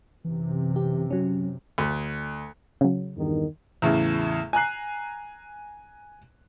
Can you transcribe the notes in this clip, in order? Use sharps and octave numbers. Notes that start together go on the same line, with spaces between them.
F#2 C3 E3
G4
F#3 C#4
D2
C#3 F#3
E2 G2 D#3
E2 A2 C#3
G#5 A#5 F#6 C7